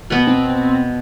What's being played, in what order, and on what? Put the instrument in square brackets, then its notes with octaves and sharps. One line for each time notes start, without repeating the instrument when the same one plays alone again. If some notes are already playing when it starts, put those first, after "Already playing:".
[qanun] B2 B3
[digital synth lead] C4